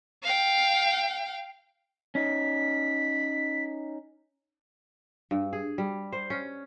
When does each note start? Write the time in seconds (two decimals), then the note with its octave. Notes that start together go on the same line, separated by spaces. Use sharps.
0.23 F5 G5
2.15 C#4 D#4 B6
5.31 G2
5.53 G#4
5.78 G3
6.12 C5
6.30 C#4